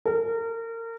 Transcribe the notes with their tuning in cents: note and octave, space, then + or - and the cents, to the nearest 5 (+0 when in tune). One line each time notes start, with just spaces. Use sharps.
A#4 -30